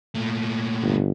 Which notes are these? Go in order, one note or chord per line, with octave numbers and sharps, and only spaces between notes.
A#2 A3
G1